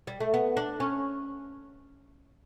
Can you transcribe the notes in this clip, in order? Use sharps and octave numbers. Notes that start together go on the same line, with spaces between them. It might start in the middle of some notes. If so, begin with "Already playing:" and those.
G3
A3
B3
D4
C#4